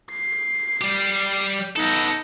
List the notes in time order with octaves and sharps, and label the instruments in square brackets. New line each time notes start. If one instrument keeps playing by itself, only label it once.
[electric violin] C7
[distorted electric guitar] G3 G4
[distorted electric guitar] B3 A4 [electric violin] D#4 A#6